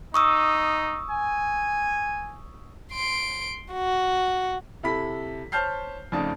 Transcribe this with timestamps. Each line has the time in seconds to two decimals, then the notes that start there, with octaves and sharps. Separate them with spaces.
0.14 D#4 C#6 D#6 E6
1.10 G#5
2.92 C6 D7
3.72 F#4
4.83 C3 E4 A4 B5 B6
5.52 C5 C#5 A5 F6 G6 C7
6.12 F2 C#3 A3 D#4 D5 A5